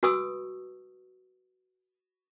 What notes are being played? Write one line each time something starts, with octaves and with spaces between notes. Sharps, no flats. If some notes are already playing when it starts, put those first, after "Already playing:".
F#4 B4 G#5 C#6 D#6 E6